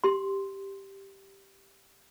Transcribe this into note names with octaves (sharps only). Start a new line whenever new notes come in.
G4 C6